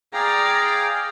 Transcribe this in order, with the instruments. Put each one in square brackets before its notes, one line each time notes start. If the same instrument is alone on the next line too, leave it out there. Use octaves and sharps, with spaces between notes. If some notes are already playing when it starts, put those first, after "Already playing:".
[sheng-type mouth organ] G#4 F5 G5 [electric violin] D5 A#5